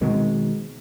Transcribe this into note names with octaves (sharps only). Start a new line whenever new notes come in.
B2 D#3 G#3 C4